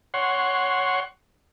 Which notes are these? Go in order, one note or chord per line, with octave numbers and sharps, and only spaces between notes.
C#5 F#5 C6